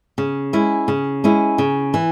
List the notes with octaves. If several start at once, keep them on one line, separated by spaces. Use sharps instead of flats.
C#3
G#3 C#4 E4
C#3
G#3 C#4 E4
C#3
E3